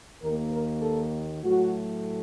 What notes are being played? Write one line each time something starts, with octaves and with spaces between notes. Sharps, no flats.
D#2 D#3 A#3 A#4
A#4
A4
A2 F#3 A3 F#4